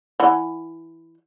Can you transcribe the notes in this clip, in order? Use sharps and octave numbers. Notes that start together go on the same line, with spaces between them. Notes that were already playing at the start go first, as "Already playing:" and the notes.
E3 F#5